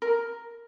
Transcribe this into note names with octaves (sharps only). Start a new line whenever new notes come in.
A#4